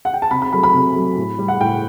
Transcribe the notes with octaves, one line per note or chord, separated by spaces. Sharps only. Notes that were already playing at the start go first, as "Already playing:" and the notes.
F#5
G5
A5
C3 B5
B5
F#3 A3 B5
B5
C3
F#3 A3
A2
G3
F#5
A2 G5